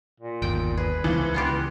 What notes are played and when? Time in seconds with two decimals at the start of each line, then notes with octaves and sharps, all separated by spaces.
0.20 A#2
0.42 G1 D#2 G5
0.77 G#4 B4
1.04 C#2 E3 F3 A5
1.34 B3 F4 G4